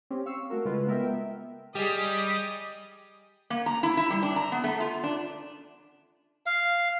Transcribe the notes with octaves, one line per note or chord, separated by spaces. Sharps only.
C4 C#4 G4
F5 C#6 E6
A3 F#4 A#4
C#3 G#3 F4 B4
B3 A#4 E5 G5
G3 G4 G#4 D#5
A#3
A#5
E4
E4
G3
D4
A#5
B3
A3
F4
D4
F5